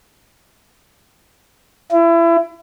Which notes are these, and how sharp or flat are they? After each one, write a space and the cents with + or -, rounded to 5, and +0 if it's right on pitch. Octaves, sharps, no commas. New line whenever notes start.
E4 +30